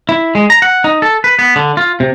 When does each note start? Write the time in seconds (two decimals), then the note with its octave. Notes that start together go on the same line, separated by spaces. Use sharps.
0.09 E4
0.35 G#3
0.50 A#5
0.62 F#5
0.84 D#4
1.02 A4
1.24 B4
1.39 B3
1.56 D3
1.77 F4
2.00 C3